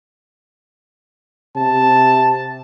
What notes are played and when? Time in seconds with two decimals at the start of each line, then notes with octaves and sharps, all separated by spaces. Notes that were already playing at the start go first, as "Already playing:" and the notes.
1.56 C3 A5